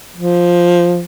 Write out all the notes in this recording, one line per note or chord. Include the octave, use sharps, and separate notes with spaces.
F3